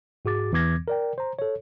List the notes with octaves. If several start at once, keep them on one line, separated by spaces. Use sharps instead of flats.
G#2 F#4 G#4 D6 A6
E2 E3 B3 D6 G#6 A#6
A#4 D5 G5
C5 A#5
A4 C#5